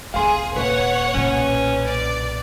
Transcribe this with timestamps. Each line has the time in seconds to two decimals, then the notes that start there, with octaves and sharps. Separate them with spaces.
0.14 B1 E2 G#4 F5 C6
0.56 D#1 B4 C#5 F#5
1.15 B1 A#2 C#4
1.86 D5